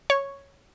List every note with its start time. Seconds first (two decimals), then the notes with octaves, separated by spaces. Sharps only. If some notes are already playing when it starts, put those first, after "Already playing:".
0.10 C#5